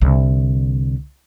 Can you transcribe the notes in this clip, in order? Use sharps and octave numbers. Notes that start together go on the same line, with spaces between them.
C2 D3